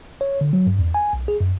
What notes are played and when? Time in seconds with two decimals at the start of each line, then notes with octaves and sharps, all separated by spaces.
0.21 C#5
0.41 D3
0.53 F#3
0.67 G2
0.79 E2
0.94 G#5
1.13 B1
1.28 G#4
1.40 F#2